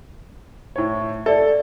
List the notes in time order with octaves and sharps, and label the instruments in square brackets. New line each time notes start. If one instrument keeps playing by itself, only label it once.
[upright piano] A2 C#5
[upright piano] A4 [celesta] D5 E5